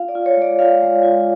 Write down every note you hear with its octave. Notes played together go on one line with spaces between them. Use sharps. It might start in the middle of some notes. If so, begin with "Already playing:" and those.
Already playing: F4 F5
D5
F4
C#5
G#3 D5
F4 F5
G#3
F4